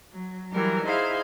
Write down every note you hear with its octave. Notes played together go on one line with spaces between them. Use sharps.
F#3
E3 F#3 G3 A#4
D#4 E4 G#4 C5 F5